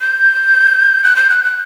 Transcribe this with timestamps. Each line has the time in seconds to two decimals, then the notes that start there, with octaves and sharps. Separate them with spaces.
0.01 G6
1.04 F#6
1.16 G6
1.30 F#6
1.44 F#6